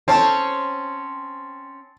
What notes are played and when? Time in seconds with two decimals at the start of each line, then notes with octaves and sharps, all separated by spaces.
0.08 C4 C#4 C5 A5